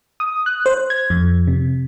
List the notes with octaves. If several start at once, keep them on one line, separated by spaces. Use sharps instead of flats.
D#6
F#6
C5
G#6
F2
C3